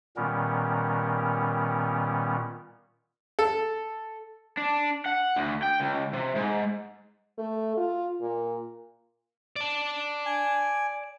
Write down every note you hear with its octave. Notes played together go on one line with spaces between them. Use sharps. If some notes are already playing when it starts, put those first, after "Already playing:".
A#2 D#3 G3 B3 C#4 A#4
A4
D4
F#5
D2
G5
C#2
C3
G#2
A3
F4
A#2
D5 A5
G#5